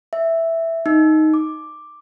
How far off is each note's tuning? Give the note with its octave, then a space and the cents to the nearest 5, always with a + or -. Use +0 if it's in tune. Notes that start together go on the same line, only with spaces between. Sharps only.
E5 +0
D#4 +5
D6 +5